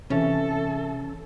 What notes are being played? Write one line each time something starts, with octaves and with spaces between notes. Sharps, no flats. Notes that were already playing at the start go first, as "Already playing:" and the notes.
C3 E3 C#4 A4 E5